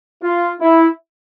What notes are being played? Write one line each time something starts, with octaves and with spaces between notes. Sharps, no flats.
F4
E4